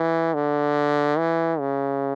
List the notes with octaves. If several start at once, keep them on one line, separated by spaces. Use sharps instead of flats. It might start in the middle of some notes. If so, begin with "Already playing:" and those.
Already playing: E3
D3
E3
C#3